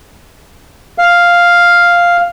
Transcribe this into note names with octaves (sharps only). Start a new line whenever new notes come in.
F5